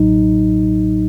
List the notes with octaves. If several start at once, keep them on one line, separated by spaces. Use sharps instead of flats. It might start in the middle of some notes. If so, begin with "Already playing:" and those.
Already playing: A1 A2 F#3 D#4